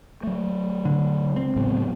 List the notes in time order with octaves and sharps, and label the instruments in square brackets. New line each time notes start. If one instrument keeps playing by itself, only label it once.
[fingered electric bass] F#3 A3
[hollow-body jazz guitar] D3
C#2 C4
[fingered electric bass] A2 F#3 B3